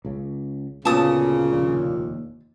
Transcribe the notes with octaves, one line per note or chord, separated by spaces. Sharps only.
C#2 C#3
D2 A#2 C#3 B3 A5 D#6
F1 D#2 D4